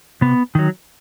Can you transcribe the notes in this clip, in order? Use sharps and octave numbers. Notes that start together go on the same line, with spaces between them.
C3 B3
D#3 F#3